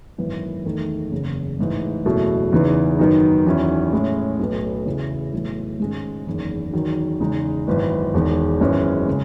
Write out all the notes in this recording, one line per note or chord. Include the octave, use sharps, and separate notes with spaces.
G#1 F#2 E3 B3
E2 D#3 A3
F#1 E2 C#3
A1 G#2 E3
F#1 E2 B2 A3 E4
E2 C#3 E3 B3 D#4
F#2 D#3 F#3 B3 D#4
E2 D#3 F#3 C#4 E4
A2 G#3 C#4 E4
B1 A2 F#3 B3
E2 C#3 E3
B1 A2 E3
G#2 D#3 G#3 C#4
F#1 E2 D#3
E2 D#3 F#3
E2 C#3 G#3 D#4
G#1 F#2 E3 B3
E1 E2 D#3
G#1 F#2 E3 G#3 C#4
C#3 G#3